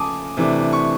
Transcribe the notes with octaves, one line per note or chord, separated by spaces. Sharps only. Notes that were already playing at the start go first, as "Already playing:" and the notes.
Already playing: C#3 F3 A3 G#5 A5 D6 D#6
C3 E3 A3 D4
C#6